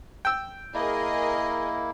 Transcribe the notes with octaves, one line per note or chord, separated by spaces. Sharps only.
G5 E6
A#3 E4 G#4 A#4 D#5